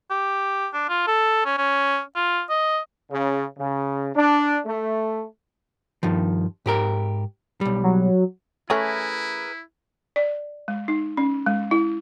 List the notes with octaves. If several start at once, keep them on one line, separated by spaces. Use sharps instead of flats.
G4
D4
F4
A4
C#4
C#4
F4
D#5
C#3
C#3
D4
A3
G2 D#3 F3
G#2 G4 A#4
B1 G3
F#3
E3 A3 C#4 E4 G#4 A#4 B4
D5
G#3
D#4
C#4
G#3
E4